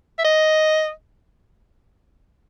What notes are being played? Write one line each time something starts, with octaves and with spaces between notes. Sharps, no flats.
E5
D#5